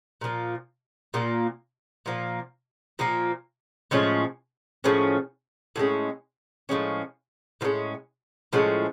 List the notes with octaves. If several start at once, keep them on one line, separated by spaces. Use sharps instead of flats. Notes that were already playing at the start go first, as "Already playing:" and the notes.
A#2 F3 A#3
A#2 F3 A#3
A#2 F3 A#3
A#2 F3 A#3
A2 F3 G#3 C#4
A2 F3 G#3 C#4
A2 F3 G#3 C#4
A2 F3 G#3 C#4
A2 F3 G#3 C#4
A2 F3 G#3 C#4